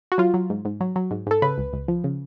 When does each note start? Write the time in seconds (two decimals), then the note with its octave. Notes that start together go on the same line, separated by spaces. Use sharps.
0.12 F#4
0.18 F#3 F4
0.34 F#3
0.50 G#2
0.65 G#2
0.81 F#3
0.96 F#3
1.11 G#2
1.27 G#2 A4
1.42 C#3 B4
1.58 C#2
1.73 C#2
1.88 F3
2.04 C#3